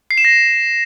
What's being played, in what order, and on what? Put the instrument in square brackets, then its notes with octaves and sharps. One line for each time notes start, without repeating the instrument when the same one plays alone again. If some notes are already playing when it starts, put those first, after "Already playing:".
[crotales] C7
E7
A#6